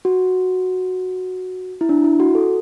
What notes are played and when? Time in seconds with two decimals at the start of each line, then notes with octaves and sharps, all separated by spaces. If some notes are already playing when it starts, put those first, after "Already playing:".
0.05 F#4
1.81 E4
1.89 D4
2.04 E4
2.20 F#4
2.35 A4